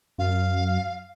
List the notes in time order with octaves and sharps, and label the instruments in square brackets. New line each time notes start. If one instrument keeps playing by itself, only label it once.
[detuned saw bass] F#2 [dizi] F5